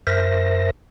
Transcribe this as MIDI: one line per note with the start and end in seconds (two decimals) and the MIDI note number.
0.07 0.71 42
0.07 0.71 70
0.07 0.71 72
0.07 0.71 76
0.07 0.71 94